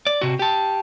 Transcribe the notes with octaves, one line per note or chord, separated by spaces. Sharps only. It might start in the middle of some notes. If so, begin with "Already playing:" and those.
D5
C3 F#4
G4 A5